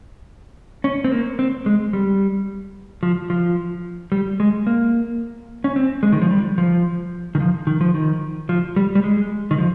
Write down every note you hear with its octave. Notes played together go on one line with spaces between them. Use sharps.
C#4
C4
A#3
C4
G#3
G3
F3
F3
G3
G#3
A#3
C#4
C4
G#3
D#3
F3
G3
F3
D#3
F3
D#3
F3
D#3
F3
G3
G3
G#3
D#3
F3